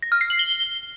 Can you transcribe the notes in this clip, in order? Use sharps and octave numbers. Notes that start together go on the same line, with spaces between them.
A#6
F6
C7
F#7
G7